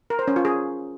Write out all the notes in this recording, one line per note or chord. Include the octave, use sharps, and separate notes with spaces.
A#4
C5
C#4
F4
G#4